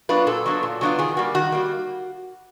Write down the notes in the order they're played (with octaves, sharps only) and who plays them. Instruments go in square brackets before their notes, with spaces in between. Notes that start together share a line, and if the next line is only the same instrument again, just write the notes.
[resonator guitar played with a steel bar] F#3 B3 D4 F4 B4
A#2 A4
F#3 B3 D4 F4
A#2
F#3 B3 D4 F4
D#3 G#4
G3 A#3 F#4
D#3 F#4
G3 A#3